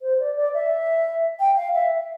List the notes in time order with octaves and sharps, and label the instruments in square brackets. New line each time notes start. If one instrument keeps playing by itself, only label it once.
[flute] C5
D5
D5
E5
G5
F5
E5